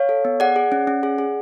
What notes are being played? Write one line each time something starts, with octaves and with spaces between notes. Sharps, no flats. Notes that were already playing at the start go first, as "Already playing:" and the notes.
Already playing: C#5 F5
A4
B3
G#4 D5 F#5
G#4
C#4
C#4
G#4
G#4